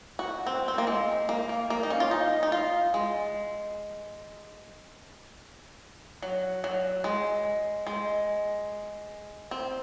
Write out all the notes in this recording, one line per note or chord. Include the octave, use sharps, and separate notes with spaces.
F#4
C4
C4
A#3
G#3
A#3
A#3
A#3
D#4
C#4
F4
D#4
D#4
F4
G#3
F#3
F#3
G#3
G#3
C4